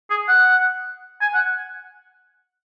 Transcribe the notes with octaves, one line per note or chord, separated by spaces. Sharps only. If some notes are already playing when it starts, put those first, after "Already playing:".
G#4
F#5
G#5
F#5